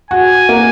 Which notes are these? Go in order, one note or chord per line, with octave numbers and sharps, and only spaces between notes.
F#4 G#5
A#3